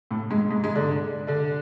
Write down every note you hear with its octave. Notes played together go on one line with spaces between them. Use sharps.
A2 A3
G#2 G#3
G#2 G#3
G#2 G#3
D3 D4
D3 D4